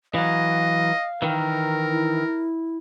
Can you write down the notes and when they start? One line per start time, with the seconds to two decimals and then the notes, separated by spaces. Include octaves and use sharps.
0.14 E3 F#3 D#5 F5
1.22 D#3 E3 A#4
1.91 E4